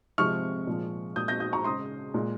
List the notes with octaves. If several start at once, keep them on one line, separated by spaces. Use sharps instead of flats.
C3 F3 G#3 C#6 F6
A#2 F3 G#3
A#2 G#3 D#6 G6
G6 A#6
D#6 G6
A#5 C#6
C#3 G#3 C6 D#6
A#2 G#3